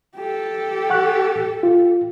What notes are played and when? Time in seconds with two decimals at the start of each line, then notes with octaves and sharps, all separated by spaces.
0.16 G4 A4
0.90 F#5 C#6 F#6
1.63 F4